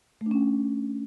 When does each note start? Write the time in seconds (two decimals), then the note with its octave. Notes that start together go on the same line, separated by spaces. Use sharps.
0.21 A3
0.26 D4
0.31 C#4